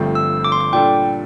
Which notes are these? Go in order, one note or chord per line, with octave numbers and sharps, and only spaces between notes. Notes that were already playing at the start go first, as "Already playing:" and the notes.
Already playing: G1 G2 F3 A3 C4
E6
D6
C6
D6
A#2 G3 D4 A4 G5